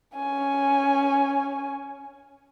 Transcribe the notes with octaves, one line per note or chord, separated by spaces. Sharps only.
C#4 G#5